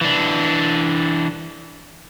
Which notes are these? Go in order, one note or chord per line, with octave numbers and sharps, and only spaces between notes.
E3 D4